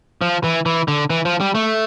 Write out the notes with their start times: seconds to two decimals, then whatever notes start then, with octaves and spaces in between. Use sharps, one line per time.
0.21 F3
0.44 E3
0.66 E3
0.88 D3
1.10 E3
1.25 F3
1.40 G3
1.55 A3